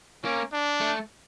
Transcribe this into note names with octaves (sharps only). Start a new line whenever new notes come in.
A#3 C#4
D4
A3